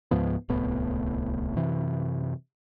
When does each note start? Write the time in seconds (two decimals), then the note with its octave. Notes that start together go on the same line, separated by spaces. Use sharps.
0.11 C#2 G#2 F3 B3
0.49 D1 C2 A2 B3
1.57 F#2 C3 E3